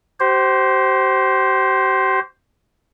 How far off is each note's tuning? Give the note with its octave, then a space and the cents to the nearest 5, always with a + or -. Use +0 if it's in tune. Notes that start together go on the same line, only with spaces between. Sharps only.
G4 -40 C5 +0